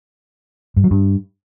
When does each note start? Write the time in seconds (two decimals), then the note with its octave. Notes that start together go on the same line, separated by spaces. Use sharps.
0.76 G2
0.84 F#3
0.91 G2